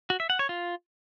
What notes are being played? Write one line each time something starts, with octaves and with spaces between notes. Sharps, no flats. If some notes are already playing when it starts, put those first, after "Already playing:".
F#4
E5
F#5
C#5
F4